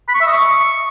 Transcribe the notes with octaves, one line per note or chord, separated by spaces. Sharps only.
B5
C#6
E5
D#5
C#6